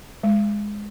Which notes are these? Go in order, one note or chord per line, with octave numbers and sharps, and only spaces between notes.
G#3